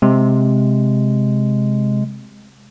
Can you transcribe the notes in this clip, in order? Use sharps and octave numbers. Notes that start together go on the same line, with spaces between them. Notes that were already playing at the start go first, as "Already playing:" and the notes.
C3 G#3